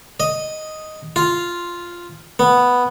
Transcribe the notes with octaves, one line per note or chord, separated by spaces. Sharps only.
D#5
F4
B3